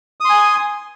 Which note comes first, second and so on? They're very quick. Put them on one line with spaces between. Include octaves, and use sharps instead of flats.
D#6 C6 G#5